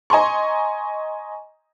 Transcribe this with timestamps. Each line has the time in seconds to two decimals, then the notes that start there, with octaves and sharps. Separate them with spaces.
0.10 D#5 G#5 A#5 C6 C#6